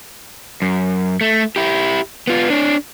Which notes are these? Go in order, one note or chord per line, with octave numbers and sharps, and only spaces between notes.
F#2
A3
E4 G4
B3 F4
D4 C#5